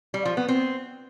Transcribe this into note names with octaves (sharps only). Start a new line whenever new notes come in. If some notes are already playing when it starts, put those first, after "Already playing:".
G3
F3
B3
C4